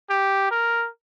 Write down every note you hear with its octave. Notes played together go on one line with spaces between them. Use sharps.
G4
A#4